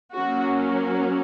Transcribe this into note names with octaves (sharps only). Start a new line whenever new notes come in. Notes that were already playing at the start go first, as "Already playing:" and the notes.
F#3 A#3 C#4 F#4